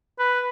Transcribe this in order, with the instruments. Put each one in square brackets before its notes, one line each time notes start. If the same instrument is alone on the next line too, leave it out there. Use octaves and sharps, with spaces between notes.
[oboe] B4